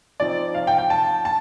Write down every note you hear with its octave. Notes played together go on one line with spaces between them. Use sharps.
F3 C4 D#4 D5
F5
G5
G5
A5
A5